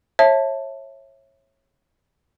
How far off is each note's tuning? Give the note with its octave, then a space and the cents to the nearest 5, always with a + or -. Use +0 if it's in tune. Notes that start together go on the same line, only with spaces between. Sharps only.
C#5 -30 E5 +0 A5 +0